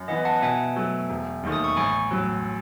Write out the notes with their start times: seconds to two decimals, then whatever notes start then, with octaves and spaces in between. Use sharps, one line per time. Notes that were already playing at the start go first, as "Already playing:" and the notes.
Already playing: F#2
0.08 E3 B3 D#5 F#5
0.25 F#5 A5
0.36 A5
0.42 B2 E5 G#5
0.76 F#3 A3
1.10 E1
1.43 D#2 D#3 A3
1.52 D#6
1.64 C#6
1.77 A1 G#5 B5
2.11 A2 F#3